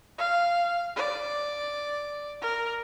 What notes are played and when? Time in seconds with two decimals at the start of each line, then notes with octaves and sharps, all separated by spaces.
0.18 F5
0.96 D5
2.41 A#4